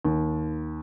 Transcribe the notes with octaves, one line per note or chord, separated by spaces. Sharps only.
D#2